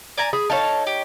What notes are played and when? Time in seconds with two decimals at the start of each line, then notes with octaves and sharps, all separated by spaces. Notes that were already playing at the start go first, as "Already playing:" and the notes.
0.17 D5 G#5 A#5
0.33 G#4 B5
0.50 D#4 A4 C#5 F5 A5
0.87 G4